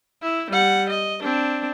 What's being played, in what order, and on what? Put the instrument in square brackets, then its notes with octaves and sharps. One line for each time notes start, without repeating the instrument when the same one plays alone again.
[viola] E4
G3 F#5
D#5
C4 D4